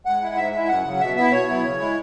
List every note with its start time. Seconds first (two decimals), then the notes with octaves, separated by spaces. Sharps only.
0.05 G#2 F#5
0.22 G#3 E4
0.37 G#2 E5
0.52 G#3 E4 E5
0.68 F#2 F#5
0.84 C#3 F#3
1.01 B2 E5
1.16 B3 E4 E5
1.32 B2 C#5
1.48 F#3 B3 E4
1.65 C#3
1.80 G#3 E4